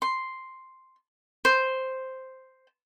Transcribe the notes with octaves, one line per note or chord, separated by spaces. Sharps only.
C6
C5